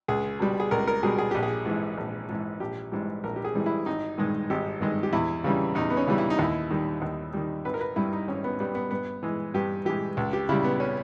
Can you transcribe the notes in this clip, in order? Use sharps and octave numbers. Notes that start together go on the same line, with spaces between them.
C#2 G#4
B2 G3
G#4
C#2 A#4
A#4
B2 G3 G#4
G#4
A#1 G4
G#4
G#2 E3
A#1
G#2 E3
A#1 G4
G#2 E3 G3
A#1 A#4
G4
G#4
G#2 E3 G3
E4
G#1 D#4
G2 D#3 G#3
G#1 G4
G2 D#3 G#3
G4
E2 E4
C#3 E3 G3
E2 D#4
B3
C#4
C#3 E3 G3
E4
D#4
D#2 E4
D#3 G3
D#2
D#3 G3
G#1 B4
A#4
B4
G2 G3 E4
D#4
G#1 C#4
B3
G2 G3 B3
B3
G2 B3
E3 G#3
G2 G4
E3 G#3 G4
C#2
G4
C#3 G3 E4
B3
C#4